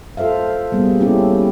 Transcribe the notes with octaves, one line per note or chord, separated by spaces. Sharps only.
F4 A4 C5 E5 F5
G3 A#3 B3 G#4
A#3 C#4 E4 G4 A4